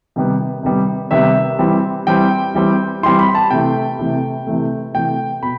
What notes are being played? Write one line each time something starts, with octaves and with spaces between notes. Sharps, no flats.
C3 D#3 G3 B3
C3 D#3 G3 B3
C3 D#3 G3 B3 E5
E3 G3 C4
E3 G3 C4 G5
E3 G3 C4
E3 G3 C4 C6
B5
A5
C3 E3 A3 G5
C3 E3 A3
C3 E3 A3
C3 E3 A3 G5
B2 B5